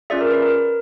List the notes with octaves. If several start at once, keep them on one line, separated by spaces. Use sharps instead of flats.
C#4 F4 G#4 D5 E5
A#4
B4
A#4